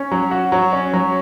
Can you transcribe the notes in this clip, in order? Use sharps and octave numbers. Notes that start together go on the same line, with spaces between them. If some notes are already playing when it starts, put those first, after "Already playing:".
Already playing: C#4
F#3
F#4
F#3
C#4
F#3